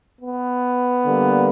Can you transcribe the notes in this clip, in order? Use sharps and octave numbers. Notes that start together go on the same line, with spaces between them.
B3
D3 G3 A#3